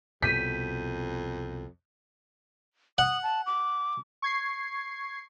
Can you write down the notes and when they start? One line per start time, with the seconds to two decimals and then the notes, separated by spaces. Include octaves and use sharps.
0.22 C2 F2 B2 G6 B6 D#7
2.98 F#5 D#6
3.23 A5
3.46 D6
4.22 C#6 G#6 C7